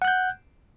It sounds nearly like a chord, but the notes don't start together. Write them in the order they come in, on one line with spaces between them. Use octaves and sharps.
F#5 F#6 G6